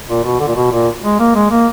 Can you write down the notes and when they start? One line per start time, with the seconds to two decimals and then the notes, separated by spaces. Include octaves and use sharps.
0.08 A#2
0.24 B2
0.40 D3
0.48 A#2
0.56 B2
0.72 A#2
1.03 G#3
1.20 A#3
1.35 G#3
1.51 A#3